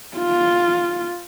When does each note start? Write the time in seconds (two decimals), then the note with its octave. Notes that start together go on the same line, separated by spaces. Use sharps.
0.17 F4